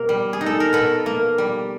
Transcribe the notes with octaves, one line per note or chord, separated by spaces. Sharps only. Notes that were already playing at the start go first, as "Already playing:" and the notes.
Already playing: B2 A#3 G4
G3
G#4
D#4
A4
A#4
B2 A4 B4
A#3
G3